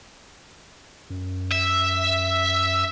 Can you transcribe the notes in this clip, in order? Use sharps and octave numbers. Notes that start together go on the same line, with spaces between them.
F#2
E5